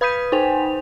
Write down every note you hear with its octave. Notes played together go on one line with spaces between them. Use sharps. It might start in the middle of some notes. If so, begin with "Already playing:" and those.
B4 B5 D#6 G6 B6 D#7
D#4 C5 G5 G#5 F7